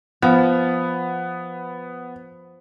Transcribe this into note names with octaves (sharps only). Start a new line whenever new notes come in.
F3 B3